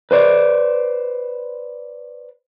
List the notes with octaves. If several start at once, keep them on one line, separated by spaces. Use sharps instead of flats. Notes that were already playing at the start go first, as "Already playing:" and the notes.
B4 C5 D5